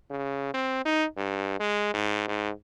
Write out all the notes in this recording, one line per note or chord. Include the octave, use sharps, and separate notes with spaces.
C#3
C4
D#4
G2
G#3
G#2
G#2